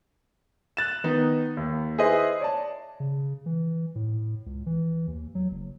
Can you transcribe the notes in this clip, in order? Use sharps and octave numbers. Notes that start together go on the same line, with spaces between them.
F#6 A6 E7
D#3 B3 D#4
D#2
E4 G#4 B4 C5 D#5
C#5 D5 A5
C#3
E3
A2
C#2
E3
D#2
F#3
F#1